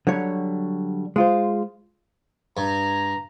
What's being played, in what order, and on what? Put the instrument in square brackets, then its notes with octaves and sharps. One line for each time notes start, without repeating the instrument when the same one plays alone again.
[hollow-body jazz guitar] D3 F#3 G3 C#5
G#3 F4 C5
[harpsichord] G2 [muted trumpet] A#5